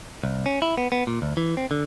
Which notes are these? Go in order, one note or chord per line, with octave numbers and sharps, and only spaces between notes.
C2
C#4
E4
B3
B3
A#2
D2
E3
C4
D3